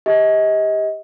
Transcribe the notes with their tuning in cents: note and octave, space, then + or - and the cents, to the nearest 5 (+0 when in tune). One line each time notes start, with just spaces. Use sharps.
G4 +20 D#5 +30